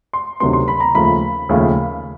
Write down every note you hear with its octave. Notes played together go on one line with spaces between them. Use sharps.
C6
D2 C3 D#3 F#3 B3 C6
C6
B5
A#5
D#2 C#3 F3 A3 B5
D#2 C#3 F3 A3